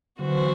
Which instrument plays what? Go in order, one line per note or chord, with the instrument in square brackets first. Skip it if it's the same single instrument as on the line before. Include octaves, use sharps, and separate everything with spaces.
[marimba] D3 F#3 [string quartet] E3 B3 F#4 C5